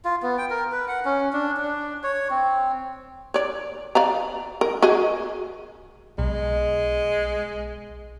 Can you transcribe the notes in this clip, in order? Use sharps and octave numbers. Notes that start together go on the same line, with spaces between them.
F4
B3
G5
A#4
B4
F#5
C#4
D4
D4
C#5
C4
C#5 D5
D5 F5 A#5
A#4
F#4 G#4 D#5
B1 G#3